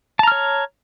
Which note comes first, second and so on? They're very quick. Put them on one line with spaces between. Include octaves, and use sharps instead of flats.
A5 A#5 F6 C#5